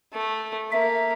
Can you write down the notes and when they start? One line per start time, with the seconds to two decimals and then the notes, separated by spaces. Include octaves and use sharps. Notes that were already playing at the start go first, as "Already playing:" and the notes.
0.13 A3
0.71 A#3 E5